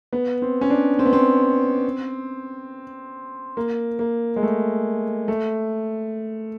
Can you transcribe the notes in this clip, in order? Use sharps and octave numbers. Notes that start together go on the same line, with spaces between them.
B3
C4
C#4
D4
C4
B3
C4
A#3
A#3
G#3
A3
A3